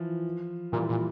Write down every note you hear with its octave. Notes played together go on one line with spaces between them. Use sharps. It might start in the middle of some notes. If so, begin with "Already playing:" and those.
Already playing: E3 F3
A#2 E3 G3
A#2